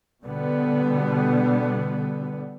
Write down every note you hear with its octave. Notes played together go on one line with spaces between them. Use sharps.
B2 D3 G3 B3